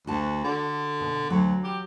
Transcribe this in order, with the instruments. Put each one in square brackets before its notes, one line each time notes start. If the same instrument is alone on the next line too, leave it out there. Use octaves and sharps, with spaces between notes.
[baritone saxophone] D2 [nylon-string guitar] F#4 A5
[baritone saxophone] D3
[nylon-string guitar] B2
[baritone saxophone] D2 [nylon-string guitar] F#3
[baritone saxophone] G4